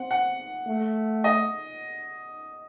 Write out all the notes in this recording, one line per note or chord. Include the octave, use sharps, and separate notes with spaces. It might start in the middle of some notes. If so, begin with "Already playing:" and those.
Already playing: C4 F#5
F#5
A3
D#5